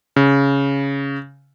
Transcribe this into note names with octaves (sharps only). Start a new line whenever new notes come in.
C#3